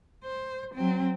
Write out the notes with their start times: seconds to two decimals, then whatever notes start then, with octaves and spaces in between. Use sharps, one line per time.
0.24 C5
0.74 F#3 C4